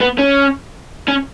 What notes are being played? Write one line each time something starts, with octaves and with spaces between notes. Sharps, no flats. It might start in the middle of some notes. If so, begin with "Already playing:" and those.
B3
C#4
C#4